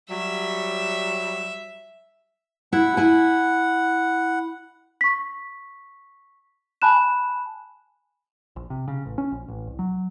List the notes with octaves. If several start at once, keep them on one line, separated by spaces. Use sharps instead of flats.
F#3 G3 E5
E4 F#5
E4 G#5
C#6 B6
G#5 A5 B5 F#6 E7
A#1
C3
C#3
A1
C#4
A#1
A1
C2
F#3